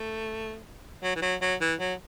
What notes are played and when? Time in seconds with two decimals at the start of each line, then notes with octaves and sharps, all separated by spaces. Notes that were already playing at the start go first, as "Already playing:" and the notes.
Already playing: A3
1.03 F#3
1.16 E3
1.22 F#3
1.42 F#3
1.61 E3
1.80 F#3